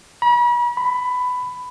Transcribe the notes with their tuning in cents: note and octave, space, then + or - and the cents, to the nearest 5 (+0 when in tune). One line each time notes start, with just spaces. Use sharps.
B5 -40
B5 +15